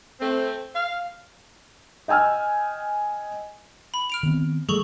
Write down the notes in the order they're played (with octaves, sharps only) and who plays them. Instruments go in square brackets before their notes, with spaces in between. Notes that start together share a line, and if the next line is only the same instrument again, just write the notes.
[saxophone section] A3 C4
F5
[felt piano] D#5 G5 G#5 E6 F6
[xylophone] B5
F6 D7 F7
[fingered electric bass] D#3 B3 C4
[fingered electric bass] E3 G3 A3 [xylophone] G#4 A4 C#6